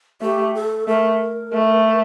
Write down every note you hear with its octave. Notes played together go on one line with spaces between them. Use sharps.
A3 G4
A4
A3 A#4
A3